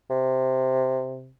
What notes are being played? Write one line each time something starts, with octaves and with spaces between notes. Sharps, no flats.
C3